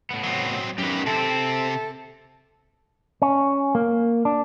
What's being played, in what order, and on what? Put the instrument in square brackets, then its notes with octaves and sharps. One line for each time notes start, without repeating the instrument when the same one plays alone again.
[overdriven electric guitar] A2 B3
[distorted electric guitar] F#3 C4
[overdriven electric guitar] F#2 D#3 [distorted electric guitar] G4 B4
[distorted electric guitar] C3 [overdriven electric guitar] C4 [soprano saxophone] A4
[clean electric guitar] C#4
A#3
D4